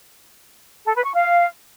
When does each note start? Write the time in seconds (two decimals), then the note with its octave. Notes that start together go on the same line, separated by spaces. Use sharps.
0.85 A4
0.95 B4
1.05 C#6
1.14 F5